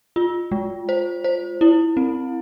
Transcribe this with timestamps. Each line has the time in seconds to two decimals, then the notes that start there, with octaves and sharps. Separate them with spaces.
0.16 F4
0.52 G#3
0.89 C5
1.24 C5
1.61 E4
1.97 C4